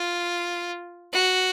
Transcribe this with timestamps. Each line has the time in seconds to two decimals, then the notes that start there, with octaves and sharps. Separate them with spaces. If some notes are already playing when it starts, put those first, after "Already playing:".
Already playing: F4
1.13 F#4